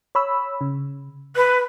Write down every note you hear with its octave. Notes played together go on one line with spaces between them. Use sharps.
C#5 B5 E6
C#3
B4 F#6